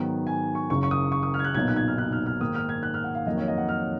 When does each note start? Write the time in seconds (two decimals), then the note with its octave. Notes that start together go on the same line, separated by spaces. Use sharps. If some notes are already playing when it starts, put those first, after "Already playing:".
Already playing: G#2 D#3 F#3 B3
0.27 G#5
0.55 C#6
0.70 F#1 F#2 C#3 C#6
0.83 C#6
0.91 D#6
1.12 C#6
1.23 D#6
1.34 F6
1.39 G#6
1.44 F#6
1.55 B1 A#2 F#3 B3 D#4 G#6
1.68 F#6
1.76 G#6
1.88 F6
1.98 F#6
2.12 F6
2.26 F6
2.40 G#2 D#3 A#3 D#6
2.55 F6
2.69 G#6
2.83 F#6
2.94 F6
3.04 F#5
3.15 F5
3.26 F2 D#3 F#3 A#3 D#5
3.37 C#5
3.48 D#5
3.58 F#5
3.69 F6